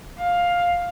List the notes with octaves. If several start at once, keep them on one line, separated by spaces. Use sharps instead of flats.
F5